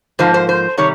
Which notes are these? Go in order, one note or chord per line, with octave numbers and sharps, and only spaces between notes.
G#2 F3 A#3 C5
C5
C5
C3 D#3 G3 C#5